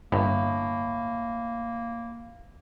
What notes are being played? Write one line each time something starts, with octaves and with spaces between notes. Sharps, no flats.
G1 A2 A#3